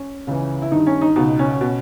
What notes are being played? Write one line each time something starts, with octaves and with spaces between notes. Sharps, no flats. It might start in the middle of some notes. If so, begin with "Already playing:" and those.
Already playing: C#4
C#2 C#3 E3
E4
G2 D#3 D#4
C#4
D#4
C#2 B2 D#4
C#4
B2